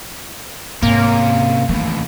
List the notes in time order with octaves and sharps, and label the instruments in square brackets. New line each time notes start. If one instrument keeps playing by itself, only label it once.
[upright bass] G#2 [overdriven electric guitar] C3 C#4 [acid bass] A#3
[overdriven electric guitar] D#2 A2 [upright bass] E3 A3